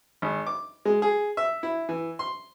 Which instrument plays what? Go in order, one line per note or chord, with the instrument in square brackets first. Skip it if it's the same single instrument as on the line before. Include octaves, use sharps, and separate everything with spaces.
[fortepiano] G#1
D6
G#3
G#4
E5
E4
E3
C6